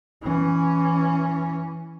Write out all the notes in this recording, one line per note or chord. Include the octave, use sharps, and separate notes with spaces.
E3 C#4